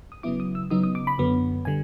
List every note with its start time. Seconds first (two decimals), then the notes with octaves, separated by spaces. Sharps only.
0.12 D#6
0.23 C#3 F#3 B3 E4 D6
0.40 D#6
0.55 E6
0.70 C#3 F#3 B3 D#4 D#6
0.84 D#6
0.95 D6
1.07 B5
1.18 F#2 D3 F#3 B3
1.65 D3 G3 G#5